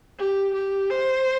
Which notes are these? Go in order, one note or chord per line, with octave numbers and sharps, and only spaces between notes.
G4
G4
C5